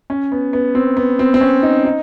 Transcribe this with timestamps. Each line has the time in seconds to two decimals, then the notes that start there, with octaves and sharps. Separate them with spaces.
0.10 C#4
0.32 B3
0.53 B3
0.75 C4
0.97 B3
1.19 C4
1.34 C4
1.41 C#4
1.63 D#4
1.85 D#4